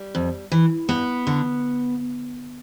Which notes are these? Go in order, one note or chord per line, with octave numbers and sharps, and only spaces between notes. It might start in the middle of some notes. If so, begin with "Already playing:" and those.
Already playing: G3
F2
E3
G2 B3
D3